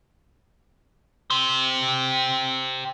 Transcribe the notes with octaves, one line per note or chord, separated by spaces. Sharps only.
G4 C5